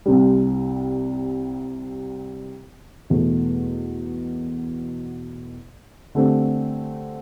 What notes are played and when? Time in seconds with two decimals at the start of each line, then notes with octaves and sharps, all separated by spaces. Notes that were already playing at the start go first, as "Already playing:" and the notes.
0.06 C2 C3 G3
3.10 E2 B2 A3
6.15 D3 A3 C4 G4